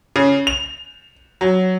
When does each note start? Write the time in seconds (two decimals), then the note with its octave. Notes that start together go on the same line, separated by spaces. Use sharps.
0.16 C#3
0.47 F7
1.41 F#3